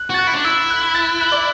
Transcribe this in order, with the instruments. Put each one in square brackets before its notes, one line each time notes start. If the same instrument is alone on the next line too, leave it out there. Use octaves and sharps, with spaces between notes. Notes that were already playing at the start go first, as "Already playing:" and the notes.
Already playing: [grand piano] F#6
[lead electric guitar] F#4 [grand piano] A6
[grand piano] F#6
[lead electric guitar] E4
D4
[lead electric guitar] E4 [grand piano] E6
[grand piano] F#6
A6
F#6
D5